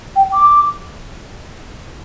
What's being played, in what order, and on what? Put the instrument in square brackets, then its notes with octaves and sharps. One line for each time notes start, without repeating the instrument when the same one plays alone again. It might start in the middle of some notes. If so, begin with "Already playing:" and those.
[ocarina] G5
D6